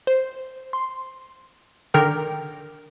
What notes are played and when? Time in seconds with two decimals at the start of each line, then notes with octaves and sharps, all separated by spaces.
0.07 C5
0.73 C6
1.94 D3 D#3 A#4 G5 D6